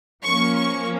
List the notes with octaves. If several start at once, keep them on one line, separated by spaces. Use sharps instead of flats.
F3 A#3 C#4 C#6
C#6